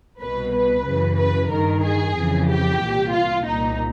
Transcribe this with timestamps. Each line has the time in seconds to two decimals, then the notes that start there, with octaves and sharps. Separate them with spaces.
0.20 C2 B2 B4
0.54 B4
0.86 F#2 C#3 E3
1.18 B4
1.50 G2 D#3 A#4
1.83 G#4
2.16 F2 C#3 E3
2.49 G4
2.82 C2 A#2
3.13 F4
3.46 C2 A#2 D#4